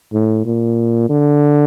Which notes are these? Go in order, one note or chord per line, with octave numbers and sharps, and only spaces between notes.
A2
A#2
D3